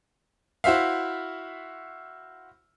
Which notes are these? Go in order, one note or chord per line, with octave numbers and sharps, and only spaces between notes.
E4 F#4 C5 E5 F5